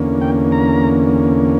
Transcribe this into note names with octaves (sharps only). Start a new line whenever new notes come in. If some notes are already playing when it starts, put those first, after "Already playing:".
Already playing: E2 D3 A#3 C#4
G5
A#5